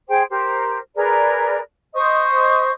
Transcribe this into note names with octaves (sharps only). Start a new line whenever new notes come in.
G#4 C5 G5
G4 A#4 C5
G#4 A#4 B4 D5
C5 D#5 C#6 D#6